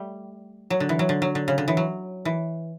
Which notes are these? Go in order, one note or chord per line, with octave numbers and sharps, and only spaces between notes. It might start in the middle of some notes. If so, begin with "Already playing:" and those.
Already playing: G3 A3
F#3
D3
E3
F#3
D3
F#3
D3
C#3
D3
E3
F#3
E3